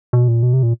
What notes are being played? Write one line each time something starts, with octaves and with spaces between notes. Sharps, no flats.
B2
A#2
B2
C3
A#2